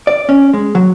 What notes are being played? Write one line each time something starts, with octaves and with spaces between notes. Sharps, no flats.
D5
C#4
G#3
F#3